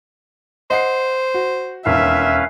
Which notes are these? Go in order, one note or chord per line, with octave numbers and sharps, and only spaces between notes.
C5 D#5 F#5 C7
F#4
E1 D#2 C#4 B4 E5 F5